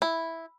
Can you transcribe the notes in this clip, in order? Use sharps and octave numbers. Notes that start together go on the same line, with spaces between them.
E4